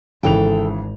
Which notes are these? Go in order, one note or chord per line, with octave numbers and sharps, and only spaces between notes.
G#1 C#3 E3 A4 G5 F7